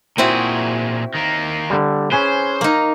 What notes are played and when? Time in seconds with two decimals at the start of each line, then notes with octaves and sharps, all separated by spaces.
0.18 A#2 C4 E4 F#4 G#4
1.14 D#3 A#3
1.70 D3 G3
2.12 C#4 G#4 B4 C5
2.61 A#3 D#4